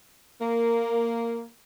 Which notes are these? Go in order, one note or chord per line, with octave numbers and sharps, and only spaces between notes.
A#3